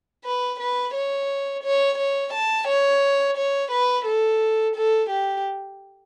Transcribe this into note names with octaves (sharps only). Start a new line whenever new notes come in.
B4
B4
C#5
C#5
C#5
A5
C#5
C#5
B4
A4
A4
G4